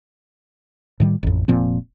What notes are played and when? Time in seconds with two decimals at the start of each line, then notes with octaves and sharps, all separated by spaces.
1.00 A2 D#3 G3
1.23 A1 F2
1.48 F1 A#2 F3 C4